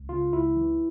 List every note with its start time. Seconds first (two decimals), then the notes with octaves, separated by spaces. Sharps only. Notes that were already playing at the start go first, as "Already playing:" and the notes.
Already playing: C#2
0.09 C#3 F4
0.33 C#2 E4
0.56 E3